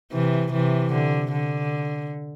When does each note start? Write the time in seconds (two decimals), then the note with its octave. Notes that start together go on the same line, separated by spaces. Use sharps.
0.12 C3 E3
0.52 C3 E3
0.93 D3
1.32 D3